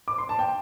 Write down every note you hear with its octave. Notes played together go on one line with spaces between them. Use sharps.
D6
C6
A5
G5